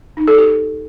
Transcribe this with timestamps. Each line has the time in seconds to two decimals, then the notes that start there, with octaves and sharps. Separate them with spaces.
0.17 D#4
0.28 A4
0.38 G4